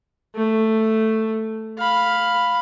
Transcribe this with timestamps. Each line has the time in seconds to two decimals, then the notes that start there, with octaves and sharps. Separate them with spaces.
0.35 A3
1.79 F5 B5